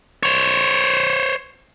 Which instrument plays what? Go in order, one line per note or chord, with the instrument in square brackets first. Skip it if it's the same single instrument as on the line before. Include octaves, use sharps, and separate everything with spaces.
[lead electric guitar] C5 C#5